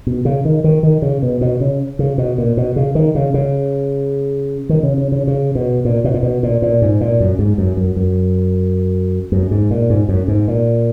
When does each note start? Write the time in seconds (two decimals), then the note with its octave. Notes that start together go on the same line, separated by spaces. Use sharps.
0.07 B2
0.25 C#3
0.45 D#3
0.64 D#3
0.83 D#3
1.02 C#3
1.22 B2
1.41 B2
1.60 C#3
1.99 C#3
2.18 B2
2.38 A#2
2.57 B2
2.76 C#3
2.95 D#3
3.15 C#3
3.34 C#3
4.69 D#3
4.83 C#3
4.98 C#3
5.12 C#3
5.27 C#3
5.55 B2
5.85 A#2
6.04 B2
6.14 A#2
6.23 B2
6.43 A#2
6.62 A#2
6.82 G#2
7.01 A#2
7.20 F#2
7.39 G#2
7.58 F#2
7.77 F#2
7.96 F#2
9.32 F#2
9.51 G#2
9.71 A#2
9.90 G#2
10.09 F#2
10.28 G#2
10.48 A#2